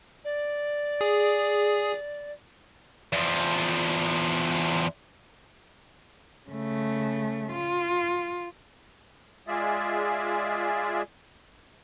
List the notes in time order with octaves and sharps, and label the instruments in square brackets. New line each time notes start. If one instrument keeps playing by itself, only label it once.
[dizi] D5
[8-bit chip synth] G#4
[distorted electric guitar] E2 F3
[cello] C#3 A3
F4
[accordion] G#3 F4 G#4 D5 E5